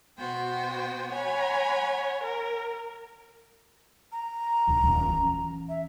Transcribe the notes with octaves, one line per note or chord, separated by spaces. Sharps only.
B2 B3 F#4 C5 G5
C#5 F#5 G#5 B5
A#4
A#5
A1 D2
D#1 E3
E3 C#4
E5